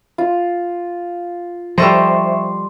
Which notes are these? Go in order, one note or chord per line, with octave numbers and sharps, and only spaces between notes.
F4
F3 G3 A4 C5 D#5 E5 C6 C#6